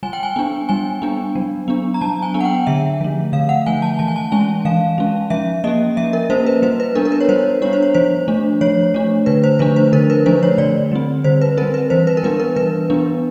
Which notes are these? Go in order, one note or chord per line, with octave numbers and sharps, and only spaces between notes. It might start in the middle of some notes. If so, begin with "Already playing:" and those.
G3 G#5
G5
G#5
B3 D4
G3 G#5
B3 D4
F#3
B3 D4
A#5
F#3 A5
G#5
B3 D4
F#5
G5
D3 E5
F3 A3
D3 F5
F#5
F3 A3 G#5
A5
E3 A5
G#5
A5
G#3 C#4 G#5
E3 F5
G#3 C#4
F3 E5
A#3 C#4 D#5
F3 E5
A#4
A#3 C#4 C5
B4
G3 C5
B4
B3 D4 A#4
A#4
B4
C#5
G3 C5
B3 D4 C#5
C5
C#5
F3 C5
A3 D4
F3 C#5
A3 D4
D3 B4
C5
F3 A3 D4 B4
C5
D3 A#4
B4
F3 A3 D4 C5
C#5
D3 D5
G3 C4
D3 C5
B4
G3 C4 A#4
B4
E3 C5
B4
A#4
G3 B3 D4 B4
A#4
E3 B4
G3 B3 D4